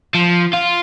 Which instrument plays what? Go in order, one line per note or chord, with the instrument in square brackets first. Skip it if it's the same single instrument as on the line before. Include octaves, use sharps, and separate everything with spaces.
[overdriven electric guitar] F3
F4